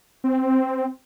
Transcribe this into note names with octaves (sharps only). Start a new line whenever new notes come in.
C4